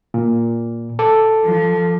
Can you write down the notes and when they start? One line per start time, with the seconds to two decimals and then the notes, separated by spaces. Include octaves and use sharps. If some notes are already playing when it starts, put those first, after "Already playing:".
0.14 A#2
0.99 A4 D6
1.43 F3